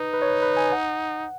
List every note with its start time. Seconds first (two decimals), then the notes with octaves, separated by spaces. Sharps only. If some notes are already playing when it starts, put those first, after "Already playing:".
Already playing: D#4 B4
0.14 B4
0.22 C#5
0.28 B4
0.42 B4
0.57 G#5
0.72 F#5